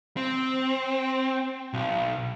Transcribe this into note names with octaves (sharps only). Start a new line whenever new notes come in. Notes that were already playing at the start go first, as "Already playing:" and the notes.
C4
B1